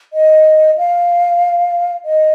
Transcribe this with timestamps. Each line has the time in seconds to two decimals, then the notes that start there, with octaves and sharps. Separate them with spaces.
0.13 D#5
0.78 F5
2.05 D#5